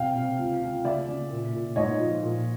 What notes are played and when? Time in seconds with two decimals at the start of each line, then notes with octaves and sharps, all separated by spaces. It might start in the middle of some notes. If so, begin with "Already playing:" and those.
Already playing: C3 F5 G5
0.16 C3
0.38 C#2
0.61 C#2
0.84 C#3 D5 E5
1.07 C#3
1.30 A#2
1.53 A#2
1.76 G#2 C#5 D#5
2.00 F3
2.23 A#2